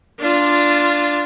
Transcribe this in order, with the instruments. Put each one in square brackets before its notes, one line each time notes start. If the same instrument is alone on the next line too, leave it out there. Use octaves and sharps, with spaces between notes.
[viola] D4 F4